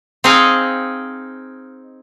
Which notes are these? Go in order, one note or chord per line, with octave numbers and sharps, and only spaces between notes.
C4 D#4 G#4 D#5 F5 G#5